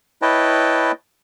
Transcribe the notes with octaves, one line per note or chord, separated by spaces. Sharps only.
E4 B4 C#5 D#5 G5 A5